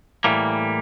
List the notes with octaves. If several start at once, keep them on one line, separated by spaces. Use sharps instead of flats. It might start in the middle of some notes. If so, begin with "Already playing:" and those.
A2 E3 G3 A#3